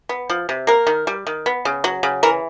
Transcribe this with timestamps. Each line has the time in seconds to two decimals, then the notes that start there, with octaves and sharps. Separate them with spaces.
0.09 B3
0.29 F3
0.49 C3
0.67 A#3 A#4
0.87 D#3
1.07 G3
1.27 D#3
1.46 B3
1.65 C#3
1.84 F#3
2.03 C#3
2.23 E3 A#4